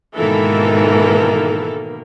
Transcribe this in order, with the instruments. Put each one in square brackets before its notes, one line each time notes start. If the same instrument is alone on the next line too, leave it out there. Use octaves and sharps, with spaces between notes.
[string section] G#2 [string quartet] B2 D#3 A#3 [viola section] E3 A4